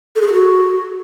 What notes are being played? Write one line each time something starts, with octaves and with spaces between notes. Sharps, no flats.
A4
G#4
A4
F#4